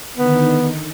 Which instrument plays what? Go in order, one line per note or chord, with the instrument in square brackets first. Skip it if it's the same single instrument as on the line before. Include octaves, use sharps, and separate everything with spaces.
[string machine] D3 D#3 D#4 [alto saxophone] B3